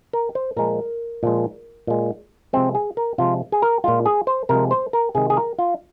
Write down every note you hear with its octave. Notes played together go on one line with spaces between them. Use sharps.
A#4
C5
A#2 F3 G#3 A#4
A#2 F3 G#3
A#2 G#3
C3 F3 G#3 C4
G#4
A#4
C3 F3 G#3 F4
G#4
A#4
A#2 G#3 F4
G#4
C5
C3 F3 G#3 A#4
C5
A#4
C3 D#3 G#3 G#4
G#4
A#4
F4